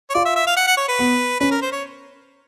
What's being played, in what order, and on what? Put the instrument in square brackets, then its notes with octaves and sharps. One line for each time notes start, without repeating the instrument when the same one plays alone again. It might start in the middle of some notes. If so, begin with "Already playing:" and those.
[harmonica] C#5
[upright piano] F4 [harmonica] D5
[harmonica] E5
E5
F5
F#5
F#5
C#5
B4
[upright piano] B3
[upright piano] C#4 [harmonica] B4
[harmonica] A#4
C5
C#5